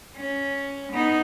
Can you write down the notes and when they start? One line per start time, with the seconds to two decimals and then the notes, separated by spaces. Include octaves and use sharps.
0.16 C#4
0.93 B3 D#4